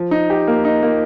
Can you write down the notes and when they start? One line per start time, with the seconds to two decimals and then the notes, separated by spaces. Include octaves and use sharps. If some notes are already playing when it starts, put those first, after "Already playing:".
Already playing: F3
0.11 D#4
0.30 G4
0.47 A#3
0.65 D#4
0.82 A#3